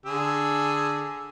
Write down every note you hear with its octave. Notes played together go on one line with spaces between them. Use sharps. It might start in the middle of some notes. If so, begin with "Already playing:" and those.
D3 G#4 E6